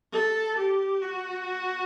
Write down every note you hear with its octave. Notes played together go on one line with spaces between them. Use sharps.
A4
G4
F#4